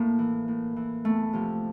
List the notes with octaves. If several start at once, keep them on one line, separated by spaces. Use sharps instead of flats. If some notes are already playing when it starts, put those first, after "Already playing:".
Already playing: A2 A#3
E3
A2
E3
E2 A3
C3 F3